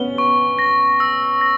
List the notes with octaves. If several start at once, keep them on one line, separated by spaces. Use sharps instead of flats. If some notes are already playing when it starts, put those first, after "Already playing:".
Already playing: B3 C#4 G7
C#6
A#6
E6
A#6